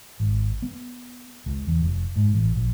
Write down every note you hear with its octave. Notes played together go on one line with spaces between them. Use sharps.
G#1
B3
C#2
E2
F1
G#2
A1
A#1